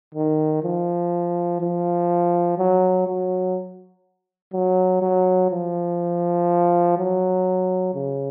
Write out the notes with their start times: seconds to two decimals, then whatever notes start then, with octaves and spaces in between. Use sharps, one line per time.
0.14 D#3
0.63 F3
1.61 F3
2.58 F#3
3.07 F#3
4.53 F#3
5.02 F#3
5.51 F3
6.97 F#3
7.94 C#3